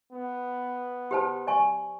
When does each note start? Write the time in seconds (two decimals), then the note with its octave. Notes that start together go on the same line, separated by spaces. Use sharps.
0.13 B3
1.11 G4 C5 A5
1.47 D5 G#5 C#6